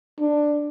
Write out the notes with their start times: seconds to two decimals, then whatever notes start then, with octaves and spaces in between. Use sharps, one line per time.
0.20 D4